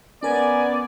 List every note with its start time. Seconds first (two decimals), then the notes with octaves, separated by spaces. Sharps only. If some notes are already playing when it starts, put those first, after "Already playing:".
0.23 B3 C#4 A#4 B4 D5 G#5